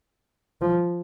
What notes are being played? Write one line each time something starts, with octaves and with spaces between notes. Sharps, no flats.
F3